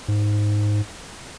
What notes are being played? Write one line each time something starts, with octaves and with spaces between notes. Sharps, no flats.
G#2